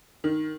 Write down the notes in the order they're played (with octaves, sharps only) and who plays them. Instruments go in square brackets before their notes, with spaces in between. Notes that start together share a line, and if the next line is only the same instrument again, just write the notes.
[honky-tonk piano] D#3